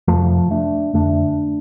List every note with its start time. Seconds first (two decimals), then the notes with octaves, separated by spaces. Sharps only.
0.08 F2 C3 F3 A3
0.51 A3 D4
0.94 F2 D3 A3 D4